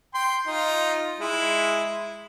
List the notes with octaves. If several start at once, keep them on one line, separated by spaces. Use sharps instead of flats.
G5 C6
D#4 F4
G#3 E4